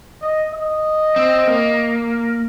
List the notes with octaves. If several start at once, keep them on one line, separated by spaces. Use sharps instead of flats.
D#5
D#5
C4
A#3